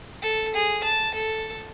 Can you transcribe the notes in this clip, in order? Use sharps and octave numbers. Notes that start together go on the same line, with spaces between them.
A4
G#4
A5
A4